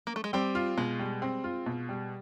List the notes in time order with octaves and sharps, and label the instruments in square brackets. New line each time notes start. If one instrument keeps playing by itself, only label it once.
[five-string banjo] A#3
A3
G#3
[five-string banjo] G3 [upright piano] C4
[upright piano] F4
[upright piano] B2 [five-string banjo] G#3
[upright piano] G3
C4
F4
B2
G3